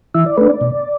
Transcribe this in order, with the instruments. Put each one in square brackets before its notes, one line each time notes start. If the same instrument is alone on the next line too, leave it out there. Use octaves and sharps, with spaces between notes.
[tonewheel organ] E3 E5
D5
A3 D4 B4
D5
B2